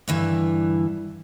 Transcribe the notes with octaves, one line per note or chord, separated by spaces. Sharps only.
G2 D3 E3